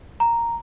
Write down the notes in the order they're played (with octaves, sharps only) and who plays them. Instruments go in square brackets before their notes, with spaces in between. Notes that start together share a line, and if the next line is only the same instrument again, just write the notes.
[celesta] A#5